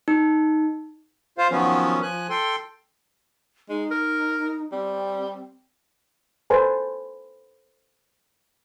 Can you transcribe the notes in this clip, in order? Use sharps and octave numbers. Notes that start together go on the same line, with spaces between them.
D#4
F4 C5 F5
D#3 F3 F#3 B3 C#4
F3 G#5 F#6
A4 G5 C6
G#3 D#4
A#4
G3 C4
A4 B4 C5 G#5 A5